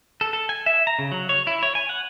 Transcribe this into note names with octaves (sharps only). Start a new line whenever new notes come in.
A4
A4
G#5
E5
A#5
C#3
F#3
C#5
E4
C#5
G#5
F#5